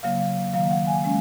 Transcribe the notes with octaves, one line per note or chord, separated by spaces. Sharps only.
C#3 F#3 A#3 F5
D#3 F#3 A#3 F5
F#5
G#5
F3 G#3 C#4 G#5